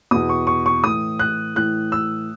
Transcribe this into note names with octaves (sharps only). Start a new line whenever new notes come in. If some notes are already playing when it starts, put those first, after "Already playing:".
E2 B2 D#6
C#6
C#6
C#6
A2 E3 D#6
F#6
A2 E3 F#6
E6